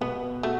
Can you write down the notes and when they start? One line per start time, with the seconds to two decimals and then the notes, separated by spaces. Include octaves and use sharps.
0.01 B2 B3
0.43 A3 F#4